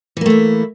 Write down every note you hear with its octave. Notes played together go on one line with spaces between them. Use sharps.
E3 A3 A#3 E4